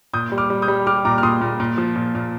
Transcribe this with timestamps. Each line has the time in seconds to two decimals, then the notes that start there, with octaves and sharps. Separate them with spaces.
0.13 A#2 D#6 G6
0.32 G3
0.38 D6 F6
0.50 G3
0.62 D#6 G6
0.68 G3
0.87 G3 D6 F6
1.05 A#2 A#5 D6
1.18 F6
1.23 A#2 C6 D#6
1.41 A#2
1.60 A#2
1.78 F3
1.96 A#2
2.15 A#2